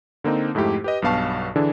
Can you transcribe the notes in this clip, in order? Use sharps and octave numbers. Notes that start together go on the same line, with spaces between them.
D3 A#3 C4 D#4
F2 G#2 A3 E4 G4
G4 B4 D#5
B1 G2 B3 F5 A5 C#6
D3 E3 D4 G#4